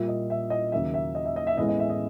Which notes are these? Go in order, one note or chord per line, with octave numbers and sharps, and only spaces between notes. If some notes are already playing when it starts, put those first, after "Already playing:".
Already playing: A#1 A#2 G3 A#3 E5
D#5
E5
D#5
D#2 C#3 F#3 A#3 E5
E5
D#5
E5
D#5
E5
A1 A2 E3 G#3 B3 D#5
D#5
E5
D#5